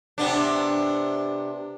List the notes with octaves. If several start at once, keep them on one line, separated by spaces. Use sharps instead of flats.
C3 B3 D4